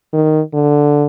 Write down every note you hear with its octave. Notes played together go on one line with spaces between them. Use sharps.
D#3
D3